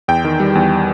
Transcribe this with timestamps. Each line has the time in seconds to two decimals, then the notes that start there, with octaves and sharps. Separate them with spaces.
0.08 E2 G5
0.25 D#3
0.40 G3
0.55 E2